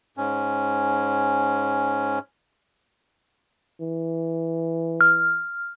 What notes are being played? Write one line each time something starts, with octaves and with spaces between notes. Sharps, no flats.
G#2 C#4
E3
F6